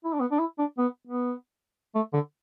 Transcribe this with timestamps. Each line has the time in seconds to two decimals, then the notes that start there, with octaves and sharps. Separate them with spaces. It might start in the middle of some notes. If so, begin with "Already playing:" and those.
0.05 E4
0.13 D4
0.20 B3
0.31 D4
0.39 E4
0.59 D4
0.78 B3
1.07 B3
1.95 A3
2.13 D3